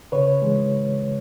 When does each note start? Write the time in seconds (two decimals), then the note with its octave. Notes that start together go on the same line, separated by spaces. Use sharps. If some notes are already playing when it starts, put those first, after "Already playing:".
0.12 C#3 B4 C#5
0.42 E3 G#3